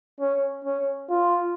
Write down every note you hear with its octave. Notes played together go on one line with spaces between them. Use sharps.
C#4
C#4
F4